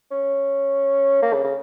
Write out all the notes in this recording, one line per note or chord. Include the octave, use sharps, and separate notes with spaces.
C#4
A#3
C#3
C#3